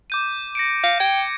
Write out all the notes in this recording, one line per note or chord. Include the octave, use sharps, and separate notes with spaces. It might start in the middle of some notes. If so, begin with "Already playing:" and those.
D6 G6 D#7
A#6 C#7 D7
F5 A#6 C#7
G5 G#6